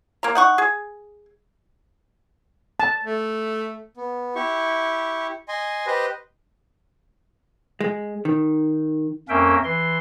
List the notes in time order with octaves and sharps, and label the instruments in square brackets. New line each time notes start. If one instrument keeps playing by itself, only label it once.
[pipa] A#3 A#5
D#4 F#5 C#6
G#4
[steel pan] A5
[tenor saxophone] A3
[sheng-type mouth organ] B3
E4 G4 C#6
D#5 G#5 C6
G4 B4 C5 D#5
[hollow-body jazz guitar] G#3
D#3
[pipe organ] F2 A#3 C#4 A#4 E5 G5
E3 C6